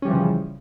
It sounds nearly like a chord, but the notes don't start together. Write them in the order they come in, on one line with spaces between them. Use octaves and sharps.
C#4 G3 E3 F3 C#3